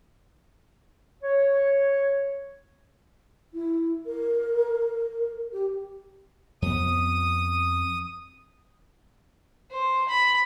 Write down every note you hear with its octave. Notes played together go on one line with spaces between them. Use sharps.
C#5
E4
A#4
G4
F2 B3 D#6
C5
B5